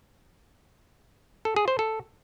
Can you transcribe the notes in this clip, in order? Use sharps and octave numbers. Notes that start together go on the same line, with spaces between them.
A4
G#4
C5
A4